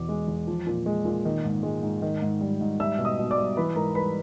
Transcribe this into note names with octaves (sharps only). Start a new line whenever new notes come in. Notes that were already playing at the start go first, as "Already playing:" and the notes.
Already playing: E2 B2 D6
G#3
E2
F3
A#2
G#3
A#2
D#3
G#2
G#3
G#2
D#3
G#2
G3
G#2
G3 E5 E6
B2
D#5 D#6
B2
D5 D6
G3
E3 B4 B5
G#2 A#4 A#5
G3 B4 B5